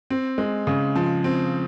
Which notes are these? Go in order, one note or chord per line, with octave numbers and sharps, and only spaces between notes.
C4
G#3
C#3
F3
C4